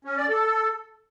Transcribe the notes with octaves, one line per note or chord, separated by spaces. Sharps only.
C#4
D5
A4